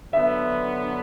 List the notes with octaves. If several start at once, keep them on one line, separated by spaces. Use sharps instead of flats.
D3 F#3 B3 D4 E5